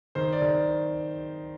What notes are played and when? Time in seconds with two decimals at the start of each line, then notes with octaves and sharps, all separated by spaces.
0.15 D#3 C5
0.33 D5
0.42 D#3